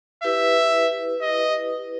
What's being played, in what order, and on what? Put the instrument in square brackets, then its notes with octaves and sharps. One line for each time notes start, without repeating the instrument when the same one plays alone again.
[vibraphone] E4 G4 B4 [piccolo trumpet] E5
[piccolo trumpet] D#5